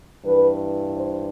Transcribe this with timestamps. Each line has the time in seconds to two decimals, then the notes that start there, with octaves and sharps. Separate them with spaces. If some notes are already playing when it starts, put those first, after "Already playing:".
0.24 G2 E3 B4
0.96 C5